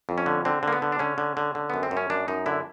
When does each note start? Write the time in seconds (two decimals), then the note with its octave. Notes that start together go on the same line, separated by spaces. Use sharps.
0.09 F2
0.18 C#4
0.26 D3
0.45 D3 C4
0.63 D3 A#3
0.73 B3
0.82 D3
0.92 D4
0.99 D3 C#4
1.18 D3
1.37 D3
1.55 D3
1.70 F#2 B3
1.83 C4
1.91 F#2
1.97 C#4
2.10 F#2 D4
2.28 F#2 D#4
2.46 D3 E4